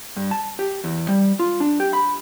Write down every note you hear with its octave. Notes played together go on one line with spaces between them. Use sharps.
G2
A5
G4
E2
G3
F4
D4
G4
B5